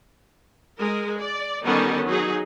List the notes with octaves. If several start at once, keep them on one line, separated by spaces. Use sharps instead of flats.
G#3 A#4
D5
D3 D#3 G3 B3 C#4 D#4
F#3 D#4 G#4